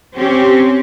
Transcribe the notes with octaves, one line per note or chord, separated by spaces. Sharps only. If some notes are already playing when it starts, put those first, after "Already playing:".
C4 C#4 G4